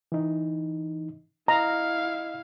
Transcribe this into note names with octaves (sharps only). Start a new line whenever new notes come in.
E3 D#4
E4 D#5 F5 A#5